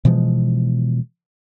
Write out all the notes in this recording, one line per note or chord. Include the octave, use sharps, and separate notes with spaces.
B2 E3 F3 G#3